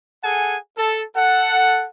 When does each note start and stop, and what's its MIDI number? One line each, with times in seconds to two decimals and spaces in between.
0.23 0.57 68
0.23 0.57 69
0.23 0.57 78
0.23 0.57 80
0.78 1.02 69
1.16 1.87 69
1.16 1.87 78